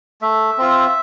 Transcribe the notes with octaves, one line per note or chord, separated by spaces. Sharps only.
A3 E5
C4 F4